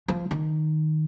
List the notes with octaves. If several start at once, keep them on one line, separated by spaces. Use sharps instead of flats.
F3
D#3